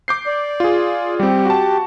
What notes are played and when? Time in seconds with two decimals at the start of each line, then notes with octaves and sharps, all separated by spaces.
0.08 D6 G6 C7
0.27 D5
0.60 F4 G#4
1.20 G3 C4 G4
1.46 F#4 A5